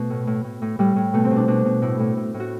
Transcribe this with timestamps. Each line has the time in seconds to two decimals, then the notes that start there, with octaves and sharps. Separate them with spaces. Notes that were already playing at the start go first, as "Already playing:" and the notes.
Already playing: B2 A3
0.10 A2
0.27 A2
0.44 A2
0.62 A2
0.79 A2 G3
0.96 A2
1.13 B2 A3
1.25 C4
1.31 B2
1.36 D4
1.48 B2 D4
1.65 B2
1.82 A2 E4
1.99 A2
2.17 A2
2.34 A2
2.40 F#4